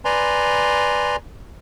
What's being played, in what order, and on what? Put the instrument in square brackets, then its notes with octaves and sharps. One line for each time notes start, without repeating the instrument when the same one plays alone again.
[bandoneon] B4 D5 G#5 A#5 C6